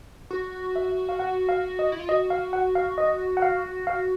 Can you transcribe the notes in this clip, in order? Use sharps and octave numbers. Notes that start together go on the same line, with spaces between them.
F#4
E5
F5
F#5
F5
D#5
E4
F4
F#4 D#5
F5
F#5
F5
D#5
F#5
F5
F5